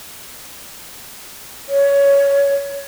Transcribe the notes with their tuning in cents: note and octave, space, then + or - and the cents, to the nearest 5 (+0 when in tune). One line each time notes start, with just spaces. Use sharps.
C#5 +15